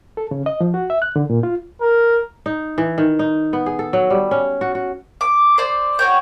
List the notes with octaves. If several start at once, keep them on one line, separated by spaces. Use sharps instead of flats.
A4
C#3
D#5
F3
F#4
E5
F#6
D3
A#2
F4
A#4
D#4
E3
D#3
D#4
B3
G#4
A4
F#3
G3
C#4
F#4
F#4
D6
C5 D5
F#4 C#5 G5